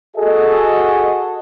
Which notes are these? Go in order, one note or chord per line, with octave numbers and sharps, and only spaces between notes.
F#4 G#4 A4 D#5